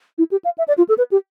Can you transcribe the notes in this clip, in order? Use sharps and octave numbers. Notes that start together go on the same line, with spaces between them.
E4
G4
F5
E5
D5
F4
A4
B4
G4